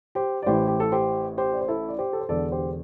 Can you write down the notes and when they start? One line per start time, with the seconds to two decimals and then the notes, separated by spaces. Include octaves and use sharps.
0.15 G4 C5
0.43 D5
0.46 A1 A2 E3 G4 C5
0.67 G4
0.80 A4
0.92 G4 C5
1.38 G4 C5
1.53 D5
1.61 C5
1.68 E4 A4
1.89 D5
1.98 G4 C5
2.13 A4
2.21 C5
2.29 E1 E2 D3 A4 D5
2.52 G4 C5